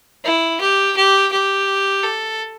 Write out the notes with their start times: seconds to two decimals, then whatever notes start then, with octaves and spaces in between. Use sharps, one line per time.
0.24 E4
0.60 G4
0.96 G4
1.32 G4
2.03 A4